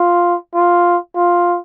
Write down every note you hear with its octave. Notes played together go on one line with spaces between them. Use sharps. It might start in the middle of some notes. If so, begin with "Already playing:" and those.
Already playing: F4
F4
F4